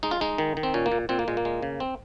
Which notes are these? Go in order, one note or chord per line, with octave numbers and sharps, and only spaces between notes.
G#3 D#4
F4
G#3 D#4
D#3
D#3
C4
A#2 C#4
A#3
A#2
A#2 C4
A#3
A#2 G#3
A#3
G#3
C#3
C4